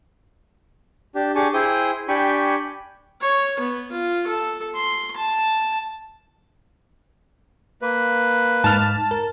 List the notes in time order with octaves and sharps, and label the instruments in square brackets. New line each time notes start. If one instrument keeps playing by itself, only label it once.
[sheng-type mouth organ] D4 G4
D4 G4 G#4 G#5 A5 C#6
E4 G#4 C5 G5 D#6 G6
D4 G4 G5 G#5 B5 C#6
[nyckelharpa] C#5
B3
F4
A4
C6
A5
[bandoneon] A#3 B4
[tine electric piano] G#2 F6 [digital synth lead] A5
[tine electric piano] A#4